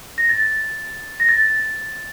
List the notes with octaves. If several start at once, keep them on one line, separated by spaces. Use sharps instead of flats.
A#6
A6
A#6
A6